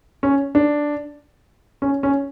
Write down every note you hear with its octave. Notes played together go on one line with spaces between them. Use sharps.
C#4
D4
C#4
C#4